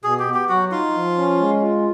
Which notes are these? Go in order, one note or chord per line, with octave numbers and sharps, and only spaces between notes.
B2 G#4
G4
B3
G4
F#3 F#4
D#4 F4
F3
C#4
G#3
F4